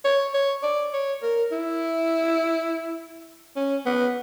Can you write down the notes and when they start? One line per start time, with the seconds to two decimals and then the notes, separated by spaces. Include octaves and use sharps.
0.05 C#5
0.34 C#5
0.63 D5
0.93 C#5
1.22 A#4
1.52 E4
3.56 C#4
3.86 B3